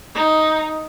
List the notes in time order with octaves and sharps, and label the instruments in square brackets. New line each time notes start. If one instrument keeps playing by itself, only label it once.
[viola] D#4